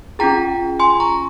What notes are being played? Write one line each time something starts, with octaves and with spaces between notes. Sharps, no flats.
C#4 F4 G#4 G5 A#5
G#5 C6
A#5 C#6